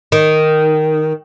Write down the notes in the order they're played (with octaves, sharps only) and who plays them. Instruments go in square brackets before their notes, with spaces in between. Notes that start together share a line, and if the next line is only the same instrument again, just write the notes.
[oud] D#3